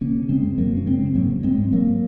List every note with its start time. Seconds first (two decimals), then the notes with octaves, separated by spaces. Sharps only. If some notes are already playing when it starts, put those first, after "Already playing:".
0.01 C#3 A#3 C#4
0.15 C#3
0.29 C#3 G#3 C4
0.43 F#2
0.57 F#2 F#3 A#3
0.72 C#3 C#4
0.86 C#3 G#3 C4
1.01 C#3
1.15 G#2 F#3 A#3
1.30 G#2
1.43 G#2 G#3 C4
1.58 G#2
1.72 G#2 F#3 A#3